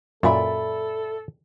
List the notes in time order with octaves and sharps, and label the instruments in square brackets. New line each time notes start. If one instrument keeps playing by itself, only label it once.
[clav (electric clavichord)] F#2 A#2 [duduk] A4 [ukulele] D5 E5 B5